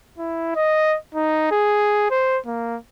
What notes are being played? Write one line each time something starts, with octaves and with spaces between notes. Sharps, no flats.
E4
D#5
D#4
G#4
C5
A#3